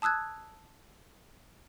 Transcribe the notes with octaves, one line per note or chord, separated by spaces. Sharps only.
A5 D#6 E6 F#6 G#6